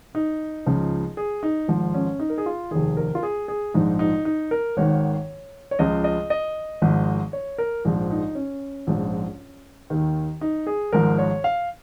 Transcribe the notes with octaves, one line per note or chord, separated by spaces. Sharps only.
D#4
C#2 C#3 F3
G#4
D#4
G#1 G#2 F3
C#4
D#4
A#4
G#4
F4
F1 D#2 D#3 G#4
A#4
F4
G#4
G#4
A#1 G#2 F3 D#4
D#4
D#4
A#4
G#1 G#2 D#3 C#5
C#5
C#2 C#3 F3 D#5
D#5
D#5
G#1 G#2 F3
C#5
A#4
A#1 G#2 F3
D#4
C#4
A#1 G#2 F3
D#2 D#3
D#4
G#4
G#1 G#2 F3 A#4
C#5
F5